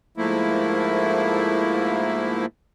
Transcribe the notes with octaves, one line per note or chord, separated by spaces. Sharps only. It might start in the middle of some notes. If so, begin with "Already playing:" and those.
G#2 F3 A3 A#3 E4